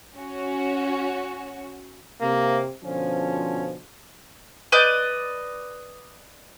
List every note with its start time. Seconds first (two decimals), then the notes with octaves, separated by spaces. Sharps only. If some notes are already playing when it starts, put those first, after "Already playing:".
0.16 C#4 F#4
2.21 C3 A#3
2.83 B2 D3 F3 C#4
4.72 B4 D5 D#5 G6